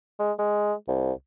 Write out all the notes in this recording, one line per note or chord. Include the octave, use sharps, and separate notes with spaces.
G#3
G#3
C2